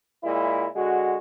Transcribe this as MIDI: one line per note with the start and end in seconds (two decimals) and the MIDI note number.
0.24 0.67 46
0.24 0.67 56
0.24 0.67 64
0.75 1.18 50
0.75 1.18 56
0.75 1.18 66